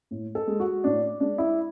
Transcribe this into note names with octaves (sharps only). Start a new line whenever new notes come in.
A2
A4
G#3
F#4
A2 D4
G#3 D4
E4